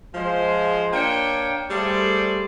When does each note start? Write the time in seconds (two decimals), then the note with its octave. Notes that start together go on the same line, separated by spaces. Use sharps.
0.15 F3 G#3 C5
0.93 A#3 D4 C#5 G5
1.70 G3 A3 G#4 A4 C5 D5